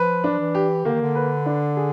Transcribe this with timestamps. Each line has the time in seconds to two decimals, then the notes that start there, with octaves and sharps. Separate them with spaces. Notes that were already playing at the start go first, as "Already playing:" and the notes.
Already playing: F3 B4
0.24 D4
0.31 F3
0.39 E3
0.55 G4
0.85 D3 A#3
0.94 D#3
1.02 D3
1.15 B4
1.46 D4
1.77 G#4